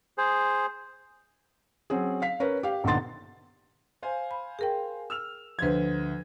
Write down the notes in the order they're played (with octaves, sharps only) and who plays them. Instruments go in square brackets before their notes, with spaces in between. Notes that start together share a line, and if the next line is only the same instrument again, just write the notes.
[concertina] G#4 C5
[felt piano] F#3 C4 C#4 G#4
F5 B6
C#4 A#4 B4
G4 F5
A#1 D3 B3 D#4 C6 A6
[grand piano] C5 F5 G#5
[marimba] B5
G#4 A#4 G5
[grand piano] E6 F6 F7
[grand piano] D2 C5 G#6 [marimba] F3 B4